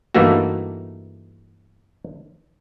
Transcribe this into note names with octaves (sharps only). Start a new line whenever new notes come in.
G2 E3 A3 A#3 D#4 F#4